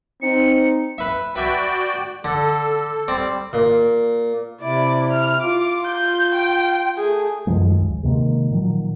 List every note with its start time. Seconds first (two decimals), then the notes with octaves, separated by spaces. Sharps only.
0.22 C4 D#4 C#7
0.98 B4 E5
1.36 F#4 B4 D5 E5 G5 G#5
2.24 D3 A4
3.08 G3 C4 D5
3.53 A#2
4.61 C3 E4 D5
5.11 F6
5.42 F4 D6
5.86 G6
6.35 G5
6.97 A3 G#4
7.47 F#2 D#3 F3 G#3
7.82 D#2
8.03 C3 D#3 G#3 A#3
8.51 A#2 D#3 F3 F#3